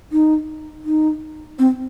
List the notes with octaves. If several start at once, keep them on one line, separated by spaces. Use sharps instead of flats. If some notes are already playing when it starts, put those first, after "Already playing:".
D#4
D#4
C4